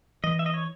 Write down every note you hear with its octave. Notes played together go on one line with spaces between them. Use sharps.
E3 D#5
E5
D#5
C#5